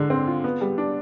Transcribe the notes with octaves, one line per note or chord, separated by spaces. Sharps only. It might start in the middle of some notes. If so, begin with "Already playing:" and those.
Already playing: D3 G#3
C4
F4
B3
G3
D4